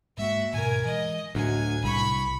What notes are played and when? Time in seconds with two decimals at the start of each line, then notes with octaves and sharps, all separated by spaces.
0.17 G#2 G#3 A#3 F#4 E5
0.52 D2 G#2 B2 A#4 G#5
0.85 E3 G#3 D#5
1.35 D2 A2 F#3 G#5
1.84 C2 B5 C#6